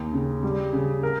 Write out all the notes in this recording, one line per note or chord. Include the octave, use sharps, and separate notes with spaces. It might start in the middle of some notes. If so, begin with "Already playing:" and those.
Already playing: D#2
C#3
G3
C#3
A#4